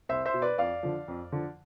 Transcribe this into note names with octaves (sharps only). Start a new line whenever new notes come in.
C2 C5 E5
C5 E5
B2
B4 D5
F2 D5 F5
D3 F3
F2
D3 F3